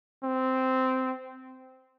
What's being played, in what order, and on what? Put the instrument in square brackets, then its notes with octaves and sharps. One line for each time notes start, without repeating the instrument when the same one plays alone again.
[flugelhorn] C4